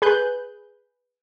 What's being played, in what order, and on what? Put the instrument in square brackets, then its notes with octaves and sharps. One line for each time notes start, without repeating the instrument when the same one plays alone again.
[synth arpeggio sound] G#4 B4 F#6 G6